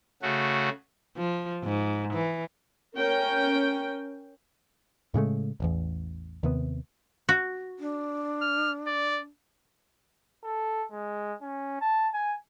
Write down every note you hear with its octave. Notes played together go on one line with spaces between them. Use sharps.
C#3 A3 F#4
F3
G#2
E3
C#4 A#4 G5
A2 C#3 G#3 A3
D#1 A1 E2
D#2 C3 B3
F#4
D4
F6
D5
A4
G#3
C#4
A5
G#5